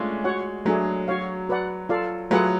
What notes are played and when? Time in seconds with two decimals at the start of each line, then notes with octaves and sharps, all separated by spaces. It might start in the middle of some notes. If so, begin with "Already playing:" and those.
Already playing: G#3 A3 C#4 D4 F4
0.24 F#4 C#5 F#5
0.65 F#3 A3 D4 G#4
1.08 F#4 C#5 F5
1.49 F#4 B4 D5 F#5
1.89 F4 A4 D5 F5
2.31 F#3 A3 F4 G#4 B4 F#5